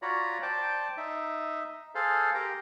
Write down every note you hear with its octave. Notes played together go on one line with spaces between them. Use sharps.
F4 F#4 C#5 D5 A#5 B5
C5 D5 G5 A5 D6
D#4 E5
G#4 A4 C5 F5
G4 A#4 G5 A#5